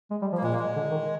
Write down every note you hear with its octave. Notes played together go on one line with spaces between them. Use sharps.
G#3
G3
F3
A#3
A#2 G#3
A#3
G#3
D3
D#3